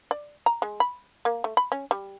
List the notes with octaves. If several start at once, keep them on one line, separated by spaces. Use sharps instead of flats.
D5
A#5
G#3
B5
A#3
A3
B5
C#4
G3